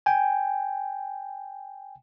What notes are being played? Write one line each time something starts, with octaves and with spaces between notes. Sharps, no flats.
G5 G#5